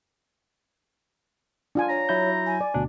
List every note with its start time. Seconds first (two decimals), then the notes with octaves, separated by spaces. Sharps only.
1.75 D4 F4 G#5
1.89 C#5 A#5
2.09 F#3 E4 G6
2.46 G#5
2.61 D5
2.74 D2 B2 D4